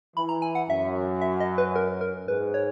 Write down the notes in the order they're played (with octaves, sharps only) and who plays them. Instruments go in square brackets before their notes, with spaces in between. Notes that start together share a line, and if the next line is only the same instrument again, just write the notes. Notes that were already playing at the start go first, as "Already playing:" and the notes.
[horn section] E3 [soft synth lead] B5
[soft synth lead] A#5
G#5
F#5
[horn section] F#2 [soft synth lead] E5
[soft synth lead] E5
D#5
B4
A#4
A#4
[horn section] G#2 [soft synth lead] B4
[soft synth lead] C#5